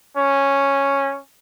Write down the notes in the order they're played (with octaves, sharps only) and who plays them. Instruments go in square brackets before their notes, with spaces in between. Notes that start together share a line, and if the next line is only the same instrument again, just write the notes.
[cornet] C#4